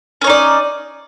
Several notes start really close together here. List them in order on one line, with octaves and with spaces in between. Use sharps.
C#4 C#5 D#4 D5